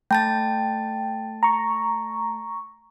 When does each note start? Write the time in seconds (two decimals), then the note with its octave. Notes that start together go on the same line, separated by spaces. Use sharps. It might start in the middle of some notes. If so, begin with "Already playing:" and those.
0.11 A3 G5 A5 A6
1.43 A#5 C#6